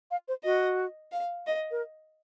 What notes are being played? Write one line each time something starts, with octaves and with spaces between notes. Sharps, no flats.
F5
C5
F#4 D#5
F5
D#5
A#4